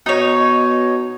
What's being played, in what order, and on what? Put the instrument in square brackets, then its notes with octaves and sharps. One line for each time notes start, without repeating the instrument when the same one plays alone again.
[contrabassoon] B2 [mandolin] D#4 C#5